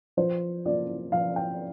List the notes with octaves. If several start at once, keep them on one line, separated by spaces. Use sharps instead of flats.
F3 C5
A#3 F4 D5
F3 F5
G5